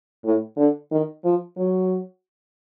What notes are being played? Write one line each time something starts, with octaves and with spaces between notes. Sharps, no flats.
A2
D3
D#3
F3
F#3